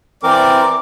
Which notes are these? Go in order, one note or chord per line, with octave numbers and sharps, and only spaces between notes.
E3 C4 A#4 D5 D6